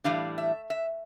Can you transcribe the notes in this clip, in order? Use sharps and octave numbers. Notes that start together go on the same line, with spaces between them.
A2 E3 G3 D4 F5
E5
E5